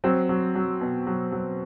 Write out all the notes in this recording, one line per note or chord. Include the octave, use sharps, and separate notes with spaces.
F#3 C4
F#3
F#3
B2
F#3
F#3